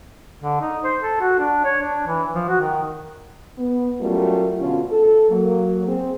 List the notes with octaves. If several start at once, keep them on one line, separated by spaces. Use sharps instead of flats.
D3
D#4
C5
A4
F#4
D4
C#5
D4
E3
F3
F#4
D#3
B3
F#3 G3 A3 C#4 F4 A#4
B2 D3 C#4 F4
A4
F#3 A#3
C4 G#4